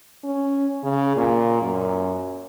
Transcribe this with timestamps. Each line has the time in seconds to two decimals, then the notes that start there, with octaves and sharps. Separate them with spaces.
0.24 C#4
0.83 C#3
1.17 A#2
1.62 F#2